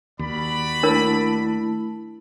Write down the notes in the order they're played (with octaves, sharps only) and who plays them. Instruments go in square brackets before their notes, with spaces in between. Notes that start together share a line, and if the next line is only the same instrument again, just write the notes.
[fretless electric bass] D#2 [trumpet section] F#4 D5 B5
[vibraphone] A3 E4 A5 [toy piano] D4 A#4